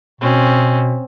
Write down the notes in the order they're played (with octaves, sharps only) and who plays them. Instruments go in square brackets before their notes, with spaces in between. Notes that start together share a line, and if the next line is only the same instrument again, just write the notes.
[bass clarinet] B2 [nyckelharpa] C4 C#4